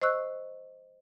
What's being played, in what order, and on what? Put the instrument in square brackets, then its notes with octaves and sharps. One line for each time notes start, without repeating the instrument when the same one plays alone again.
[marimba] C5 D#5 C#6 E6 F#6